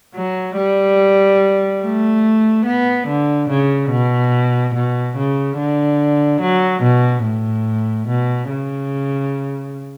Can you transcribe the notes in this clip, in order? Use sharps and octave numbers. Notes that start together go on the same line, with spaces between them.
F#3
G3
A3
B3
D3
C#3
B2
B2
C#3
D3
F#3
B2
A2
B2
C#3